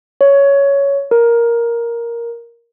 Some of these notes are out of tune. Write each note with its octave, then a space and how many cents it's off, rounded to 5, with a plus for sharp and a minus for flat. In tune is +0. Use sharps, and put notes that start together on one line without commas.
C#5 +10
A#4 +5